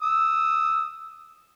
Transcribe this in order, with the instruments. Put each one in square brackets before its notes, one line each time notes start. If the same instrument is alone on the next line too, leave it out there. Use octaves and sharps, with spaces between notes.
[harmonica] D#6 E6